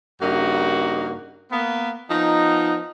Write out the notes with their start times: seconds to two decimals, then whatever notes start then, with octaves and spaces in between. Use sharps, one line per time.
0.22 G2 C#3 A#3 D#4 F#4
1.51 A#3 B3
2.10 F3 B3 D#4